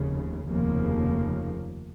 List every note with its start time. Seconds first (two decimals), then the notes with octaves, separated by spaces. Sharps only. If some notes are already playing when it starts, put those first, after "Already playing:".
Already playing: F1 D#2 C#3
0.47 F1 D#2 C#3 F3 A#3